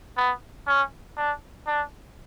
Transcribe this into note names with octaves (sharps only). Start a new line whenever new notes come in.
B3
C#4
D4
D4